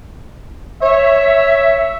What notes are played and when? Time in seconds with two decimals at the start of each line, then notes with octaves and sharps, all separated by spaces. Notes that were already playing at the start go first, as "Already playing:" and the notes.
0.82 C#5 E5